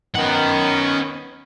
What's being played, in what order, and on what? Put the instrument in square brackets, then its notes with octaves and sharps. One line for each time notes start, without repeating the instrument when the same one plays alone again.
[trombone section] D#3 B3 [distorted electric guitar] C#4 F#5